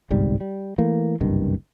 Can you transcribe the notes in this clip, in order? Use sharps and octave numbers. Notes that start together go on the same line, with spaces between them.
G1 C2 G#2 G3
G3
E3 A3 A#3
F#1 C2 G2 D#3